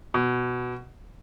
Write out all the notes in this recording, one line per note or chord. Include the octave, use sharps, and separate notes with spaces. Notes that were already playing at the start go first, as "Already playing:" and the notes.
B2